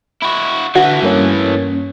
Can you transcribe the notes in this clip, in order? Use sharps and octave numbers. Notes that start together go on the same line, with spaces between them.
E4 F#4
D3 E3 A3 F#4
G2 A#3 C#4